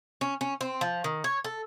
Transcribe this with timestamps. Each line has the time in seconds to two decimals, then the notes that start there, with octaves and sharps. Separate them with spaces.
0.21 C#4
0.41 C#4
0.61 C4
0.81 F3
1.04 D#3
1.24 C#5
1.44 A4